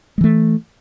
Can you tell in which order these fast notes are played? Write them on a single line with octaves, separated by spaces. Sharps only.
G#3 E3 A3